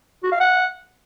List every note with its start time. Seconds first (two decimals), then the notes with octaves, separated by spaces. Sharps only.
0.24 F#4
0.32 F5
0.40 F#5